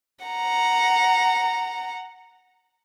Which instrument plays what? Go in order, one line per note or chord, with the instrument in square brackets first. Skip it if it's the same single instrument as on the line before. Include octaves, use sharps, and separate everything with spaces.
[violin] F#5 A#5